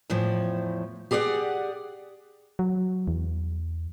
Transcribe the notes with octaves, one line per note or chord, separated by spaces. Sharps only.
E2 A2 F3
G4 G#4 D5 F5 F#5
F#3
E2